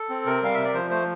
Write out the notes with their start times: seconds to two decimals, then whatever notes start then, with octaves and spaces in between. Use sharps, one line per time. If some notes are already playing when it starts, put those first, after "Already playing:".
Already playing: A4
0.09 C4
0.26 C3 A#4
0.42 G3 F5
0.54 C3 E5
0.64 D5
0.74 F3 C5
0.90 A3 C5